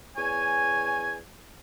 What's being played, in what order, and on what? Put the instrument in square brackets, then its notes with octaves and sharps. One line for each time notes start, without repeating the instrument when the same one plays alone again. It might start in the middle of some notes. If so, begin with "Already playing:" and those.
[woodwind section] E2 C#5 G#5